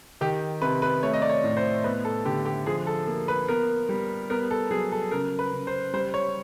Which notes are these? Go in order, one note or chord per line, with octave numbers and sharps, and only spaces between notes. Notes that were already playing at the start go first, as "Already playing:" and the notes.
D#3 G4
C3 B4
B4
A3 C#5
D#5
D5
C#5
A2
C5
B3 B4
A4
D3 G4
G4
F3 G#4
A4
A#3
B4
B3 A#4
G3
B3 A#4
A4
F#3 G#4
A4
C#3 A#4
B4
C#3
C5
G3 C5
C#5